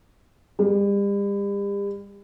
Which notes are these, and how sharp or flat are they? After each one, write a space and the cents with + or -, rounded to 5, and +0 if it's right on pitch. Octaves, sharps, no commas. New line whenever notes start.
G3 +40